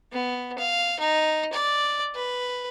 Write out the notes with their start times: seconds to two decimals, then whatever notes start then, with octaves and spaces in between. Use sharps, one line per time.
0.13 B3
0.59 F5
1.00 D#4
1.53 D5
2.15 B4